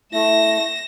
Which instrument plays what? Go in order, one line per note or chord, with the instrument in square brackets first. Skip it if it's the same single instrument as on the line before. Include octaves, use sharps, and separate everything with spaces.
[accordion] A3 [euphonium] E4 [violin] A#6 E7